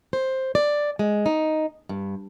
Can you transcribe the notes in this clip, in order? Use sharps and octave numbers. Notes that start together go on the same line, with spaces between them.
C5
D5
G#3
D#4
G2